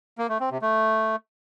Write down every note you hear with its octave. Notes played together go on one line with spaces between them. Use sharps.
A#3
A3
C4
C3
A3